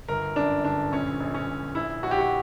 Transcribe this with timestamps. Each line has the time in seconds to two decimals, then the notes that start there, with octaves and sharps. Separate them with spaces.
0.08 G1 A#4
0.36 F#2 D4
0.65 G1 D4
0.92 A#1 C#4
1.20 A#1
1.34 C#4
1.47 A#1
1.75 A#1 E4
2.03 A#1 F#4
2.11 G4
2.19 F#4